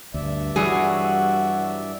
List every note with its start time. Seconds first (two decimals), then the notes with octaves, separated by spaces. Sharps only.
0.14 D2 G2 D5 E5
0.56 E3 F#3 G3 F#4 G#4